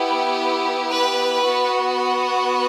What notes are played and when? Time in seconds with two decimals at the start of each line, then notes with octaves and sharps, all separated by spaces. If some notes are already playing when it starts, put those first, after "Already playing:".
Already playing: B3 E4 G4
0.91 B4
1.44 B3 F#4